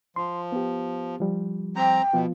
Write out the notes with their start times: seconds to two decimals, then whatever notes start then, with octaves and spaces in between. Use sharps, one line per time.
0.16 F3 C6
0.52 B3 G4
1.20 F3 G3
1.76 C4 G5 A#5
2.13 B2 F3 B3 F4